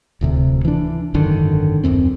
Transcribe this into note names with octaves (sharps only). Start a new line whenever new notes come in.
D1 D2 C3
E3 D4
G#1 F#2 D3 D#3
D#1 G#1 F#2 C4